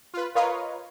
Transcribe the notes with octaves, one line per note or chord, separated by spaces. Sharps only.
F4 B4
F4 A#4 B4 C#5 D#5 F5